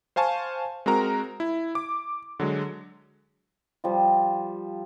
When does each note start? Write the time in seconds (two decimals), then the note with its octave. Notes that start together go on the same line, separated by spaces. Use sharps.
0.16 C5 F5 G#5 A5 C#6
0.86 G#3 C4 F#4 A#4 A#5
1.40 E4
1.75 D6
2.40 D3 F#3 G#3
3.84 F3 G3 F4